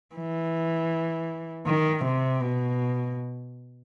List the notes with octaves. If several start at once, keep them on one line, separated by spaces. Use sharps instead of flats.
E3
D#3
C3
B2